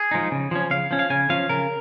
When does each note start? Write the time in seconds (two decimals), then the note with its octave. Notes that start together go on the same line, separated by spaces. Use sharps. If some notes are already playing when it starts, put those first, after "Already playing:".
Already playing: G#4
0.11 F3 G#3 D#4
0.32 C#3
0.51 F3 C#4
0.71 C#3 F5
0.91 F3 C#4
0.99 F5
1.10 C#3 G#5
1.30 F3 C#4 F5
1.49 C#3 A#4